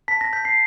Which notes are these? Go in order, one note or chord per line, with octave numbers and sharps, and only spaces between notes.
A5 B6
A#6
G6 B6
C7